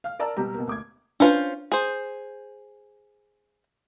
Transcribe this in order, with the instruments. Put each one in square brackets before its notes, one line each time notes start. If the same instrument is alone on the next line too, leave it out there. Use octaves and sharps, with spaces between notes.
[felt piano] F5 F6
A#4 D5 A5 A#5 E6
B2 G3 G4 A#5
B2 A#3
D2 D6 G#6
[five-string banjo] C#4 F4 C5 [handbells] D4 B4
[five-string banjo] G#4 C5